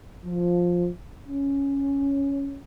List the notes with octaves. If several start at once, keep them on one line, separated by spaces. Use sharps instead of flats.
F3
C#4